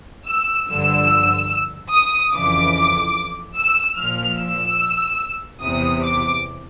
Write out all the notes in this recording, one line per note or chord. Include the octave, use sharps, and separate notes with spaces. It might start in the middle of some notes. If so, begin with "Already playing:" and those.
E6
G2 D3 F3 E6
D#6
F2 C#3 E3 D6
E6
A#2 F3 F6
E6
E2 C3 E3 D#6
D6